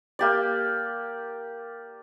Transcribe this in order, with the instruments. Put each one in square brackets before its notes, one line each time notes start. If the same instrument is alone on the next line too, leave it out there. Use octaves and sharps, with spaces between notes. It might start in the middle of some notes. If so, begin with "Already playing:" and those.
[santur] A#3 G4 D5